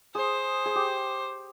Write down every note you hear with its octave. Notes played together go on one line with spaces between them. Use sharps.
G#4 C5
G#4
G4